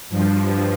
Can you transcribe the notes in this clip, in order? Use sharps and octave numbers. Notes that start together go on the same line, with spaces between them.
G2 F3